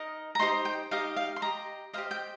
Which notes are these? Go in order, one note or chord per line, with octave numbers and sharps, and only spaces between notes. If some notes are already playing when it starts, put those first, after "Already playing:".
Already playing: D#4 A#4 D#5
A#5
D#4 G4 C5 D#5 C6
G5
D#4 G4 D#5 F5
F5
C6
G4 D#5 A#5
G4 C5 D#5 F5
G5